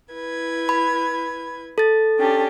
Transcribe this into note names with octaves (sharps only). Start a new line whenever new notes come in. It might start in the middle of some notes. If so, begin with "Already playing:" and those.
E4 B4 G#6
B5
A4 A6
C#4 D4 G4